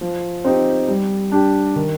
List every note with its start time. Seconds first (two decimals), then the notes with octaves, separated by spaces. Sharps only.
0.01 F3
0.44 C4 D#4 G4
0.88 G3
1.32 D4 G4
1.76 D#3